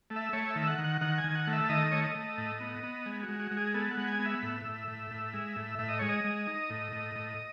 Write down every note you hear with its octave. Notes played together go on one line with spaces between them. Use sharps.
A3
E5
A3 C#5
E5
D#3
F#5
D#3
F#5
D#3 F#5
G#5
D#3
F#5
A3
E5
D#3 D#5
A3 C#5
D#5
A3
A2
B3
B3
G#3
F#4
G#3
F#4
G#3
G#4
B3 A4
F#5
G#3
G#5
B3
E5
A2
A2
A2
A2
G#3
A2
A2 E5
D#5
G#3 C#5
D#5
G#3
D#4
A2
A2
A2